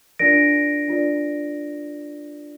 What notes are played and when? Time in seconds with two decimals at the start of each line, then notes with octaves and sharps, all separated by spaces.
0.19 D4 F4 A#4 D5 A#6 D7
0.88 D4 F4 A#4 D5